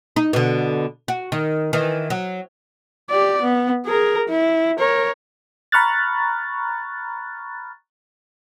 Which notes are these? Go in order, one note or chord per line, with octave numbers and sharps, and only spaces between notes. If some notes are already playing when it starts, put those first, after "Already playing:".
D#4
B2 D3
F#4
D#3
D#3 E3
F#3
G4 D5
B3
G#4 A#4
E4
A#4 C#5
A#5 B5 C#6 F6 F#6 A6